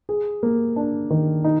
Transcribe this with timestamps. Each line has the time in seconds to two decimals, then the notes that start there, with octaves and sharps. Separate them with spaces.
0.09 G#4
0.43 A#3
0.76 D4
1.10 D#3
1.44 D#4